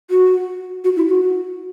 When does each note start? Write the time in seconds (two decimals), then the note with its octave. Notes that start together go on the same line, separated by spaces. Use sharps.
0.11 F#4
0.84 F#4
0.97 E4
1.08 F#4